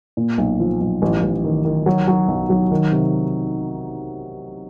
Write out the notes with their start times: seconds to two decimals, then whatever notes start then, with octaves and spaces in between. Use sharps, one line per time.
0.17 A#2
0.38 B1
0.60 F3
0.81 B1
1.02 A1
1.22 A1
1.44 D#3
1.65 D#3
1.86 F#3
2.08 F#3
2.28 B1
2.50 F#3
2.71 D#3
2.92 C3